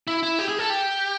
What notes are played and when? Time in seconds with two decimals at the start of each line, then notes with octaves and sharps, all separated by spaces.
0.07 E4
0.23 E4
0.39 G4
0.49 G#4
0.59 A4
0.70 G4